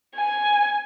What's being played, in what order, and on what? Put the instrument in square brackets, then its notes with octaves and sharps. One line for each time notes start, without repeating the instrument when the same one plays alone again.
[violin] G#5